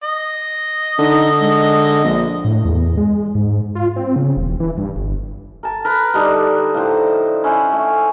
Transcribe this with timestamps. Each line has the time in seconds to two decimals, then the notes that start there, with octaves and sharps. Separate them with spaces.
0.04 D#5
0.99 D3 D#4
1.40 G#3
2.04 A#1
2.45 A2
2.65 E2
2.97 G#3
3.35 G#2
3.75 F4
3.96 C4
4.16 C#3
4.37 E1
4.60 E3
4.78 G2
4.96 G1
5.63 A#4 A5
5.85 A#4 B4
6.14 D3 G3 D4 D#4
6.74 A2 F3 C5
7.43 C#4 E4 C5 F#5
7.72 A3